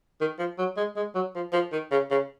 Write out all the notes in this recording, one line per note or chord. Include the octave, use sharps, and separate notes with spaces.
D#3
F3
F#3
G#3
G#3
F#3
F3
F3
D#3
C#3
C#3